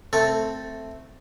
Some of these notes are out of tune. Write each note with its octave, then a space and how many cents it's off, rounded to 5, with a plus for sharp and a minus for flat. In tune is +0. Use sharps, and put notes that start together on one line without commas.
A3 +0 C4 +0 A4 +0